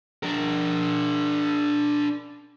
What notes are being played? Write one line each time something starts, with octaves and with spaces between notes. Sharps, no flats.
D4 A#4